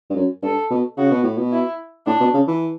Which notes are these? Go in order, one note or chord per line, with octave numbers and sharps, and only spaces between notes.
G2
F#2
G2 A4
B2
C#3 F#4
B2
A2
B2
E4
A2 D4
B2
C#3
E3